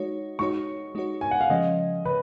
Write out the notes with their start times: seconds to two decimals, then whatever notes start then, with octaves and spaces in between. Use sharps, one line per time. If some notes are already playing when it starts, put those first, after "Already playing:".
Already playing: G#3 D#4 F#4 C#5
0.39 G#3 D#4 F#4 C#5 C#6
0.95 G#3 D#4 F#4 C#5
1.21 G#5
1.31 F#5
1.41 F5
1.50 C#3 F3 G#3 C#4 D#5
2.05 C#3 B4